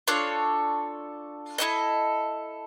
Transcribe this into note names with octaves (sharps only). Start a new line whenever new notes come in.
D4 F4 A4 C#5
E4 A4 C5 D#5